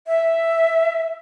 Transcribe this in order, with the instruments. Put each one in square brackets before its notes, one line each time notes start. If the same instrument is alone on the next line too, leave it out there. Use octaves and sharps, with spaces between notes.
[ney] E5